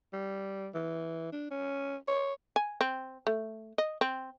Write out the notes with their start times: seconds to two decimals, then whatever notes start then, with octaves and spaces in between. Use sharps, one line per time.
0.13 G3
0.75 E3
1.33 D4
1.51 C#4
2.08 C#5
2.56 G#5
2.81 C4
3.27 A3
3.78 D#5
4.01 C4